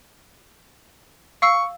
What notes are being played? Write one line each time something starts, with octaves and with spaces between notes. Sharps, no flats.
F5 C#6 E6 C7